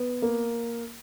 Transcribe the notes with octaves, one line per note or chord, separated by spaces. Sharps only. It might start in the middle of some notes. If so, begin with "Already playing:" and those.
Already playing: B3
A#3